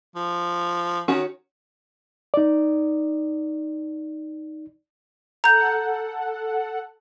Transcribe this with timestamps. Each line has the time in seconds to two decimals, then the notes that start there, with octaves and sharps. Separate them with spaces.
0.16 F3
1.08 D#3 C#4 F#4 F#5
2.34 D#4 D5
5.44 A4 F#5 A#5 G6